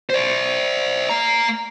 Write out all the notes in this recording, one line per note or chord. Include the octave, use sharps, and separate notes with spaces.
C5 D5
A#3 A#5